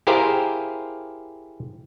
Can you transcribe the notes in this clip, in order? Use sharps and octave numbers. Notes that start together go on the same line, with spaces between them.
E4 G4 G#4 A#4 C5 F5